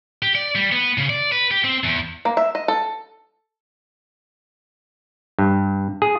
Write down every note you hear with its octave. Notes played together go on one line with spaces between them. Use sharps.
G4
D5
G3
B3
C#3
D5
B4
G4
C4
E2
A#3
E5
D#5
A4
G2
G#4